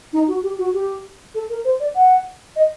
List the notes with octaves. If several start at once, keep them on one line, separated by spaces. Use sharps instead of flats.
D#4
F#4
G4
F#4
G4
A4
A#4
C5
D5
F#5
D#5